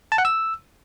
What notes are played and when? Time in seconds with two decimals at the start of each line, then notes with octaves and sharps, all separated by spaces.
0.12 A5
0.18 F#5
0.25 E6